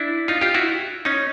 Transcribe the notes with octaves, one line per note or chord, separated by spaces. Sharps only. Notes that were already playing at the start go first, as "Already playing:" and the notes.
Already playing: D4 E4
D#4 F4
F4 G4
E4 F#4
C#4 D#4